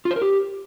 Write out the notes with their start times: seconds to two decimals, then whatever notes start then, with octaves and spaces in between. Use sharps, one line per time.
0.05 F4
0.11 C5
0.16 A#4
0.22 G4